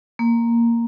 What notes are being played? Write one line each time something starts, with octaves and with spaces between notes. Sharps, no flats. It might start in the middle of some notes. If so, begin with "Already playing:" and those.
A#3